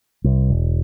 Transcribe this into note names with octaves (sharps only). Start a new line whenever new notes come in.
C2
E1